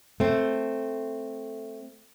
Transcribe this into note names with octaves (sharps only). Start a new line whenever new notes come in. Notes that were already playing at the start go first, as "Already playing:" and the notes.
A3 C4